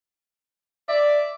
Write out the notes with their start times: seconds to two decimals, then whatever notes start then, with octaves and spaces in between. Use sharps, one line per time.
0.89 D5 E5